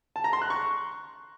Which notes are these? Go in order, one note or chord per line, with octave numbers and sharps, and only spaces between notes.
A5
A#5
C6
F#6
C#6